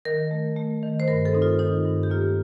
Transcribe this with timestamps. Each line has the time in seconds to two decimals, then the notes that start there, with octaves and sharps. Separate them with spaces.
0.05 D#3 A#4
0.31 A3
0.56 A3
0.83 D#3
1.00 C5
1.08 G2 A#4
1.25 A4
1.33 C4 D#4
1.42 F4
1.59 D#3 D#4
1.85 G2
2.03 G4
2.10 A#3 F4